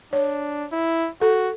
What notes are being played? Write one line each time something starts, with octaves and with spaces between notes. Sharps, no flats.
D4 C#5
E4
F#4 A4